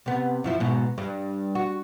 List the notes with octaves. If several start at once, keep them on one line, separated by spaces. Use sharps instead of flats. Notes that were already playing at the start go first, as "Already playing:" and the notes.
C3 B3
F#2 F3 E4
G#2 B2
G2
F#4